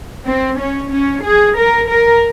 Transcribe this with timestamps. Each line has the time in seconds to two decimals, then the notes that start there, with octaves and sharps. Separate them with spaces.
0.26 C4
0.59 C#4
0.91 C#4
1.24 G#4
1.57 A#4
1.90 A#4